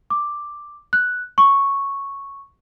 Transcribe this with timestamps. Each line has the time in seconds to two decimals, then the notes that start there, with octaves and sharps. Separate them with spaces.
0.10 D6
0.93 F#6
1.38 C#6